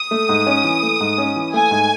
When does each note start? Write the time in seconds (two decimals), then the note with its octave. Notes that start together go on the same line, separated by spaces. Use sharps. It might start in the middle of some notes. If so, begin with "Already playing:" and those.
Already playing: D#6
0.11 A3
0.29 G#2
0.47 C#4
0.64 E3
0.83 A3
1.00 G#2
1.18 C#4
1.36 E3
1.54 A3 G#5
1.71 G#2